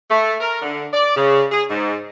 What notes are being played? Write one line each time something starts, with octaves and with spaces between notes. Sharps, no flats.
A3
A#4
D3
D5
C#3
G#4
G#2